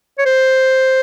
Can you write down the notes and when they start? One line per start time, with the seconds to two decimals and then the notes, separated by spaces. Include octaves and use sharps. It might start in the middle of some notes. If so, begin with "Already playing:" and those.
0.18 C#5
0.26 C5